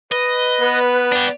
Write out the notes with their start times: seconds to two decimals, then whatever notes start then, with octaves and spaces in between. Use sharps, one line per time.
0.12 B4 D#5
0.61 B3
1.12 D4 G4